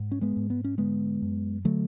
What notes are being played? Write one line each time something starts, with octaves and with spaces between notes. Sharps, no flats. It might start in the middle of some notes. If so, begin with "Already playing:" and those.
Already playing: G#2
C#4
G#3 B3
G#2
B3
C#4
D3 G#3 B3
F#2
D3 F#3 A3